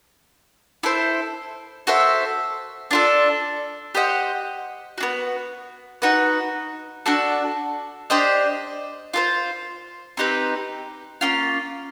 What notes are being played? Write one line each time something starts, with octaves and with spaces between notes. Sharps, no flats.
E4 A4 C5
F#4 A4 C5 E5
D4 F4 A4
G4 C5 D#5 F#5
B3 D4 F#4
D#4 F#4 B4
D4 F#4 A4
D4 G4 C5 D#5
F4 A4 C5
C4 D#4 G4 B4
A#3 C#4 F4